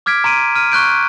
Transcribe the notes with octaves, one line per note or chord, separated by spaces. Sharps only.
D6 F6 G#6 B6 D7
A#5 C6 D7 D#7
F6 D#7
C#6 F#6 G6 D7